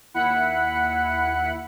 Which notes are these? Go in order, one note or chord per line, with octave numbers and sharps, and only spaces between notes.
D#2 E4 F#5 B5 F#6 C#7